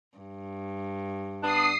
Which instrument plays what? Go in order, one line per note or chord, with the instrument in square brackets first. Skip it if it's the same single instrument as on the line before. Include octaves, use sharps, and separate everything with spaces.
[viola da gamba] G2
[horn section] B3 D4 [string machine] D#6 C7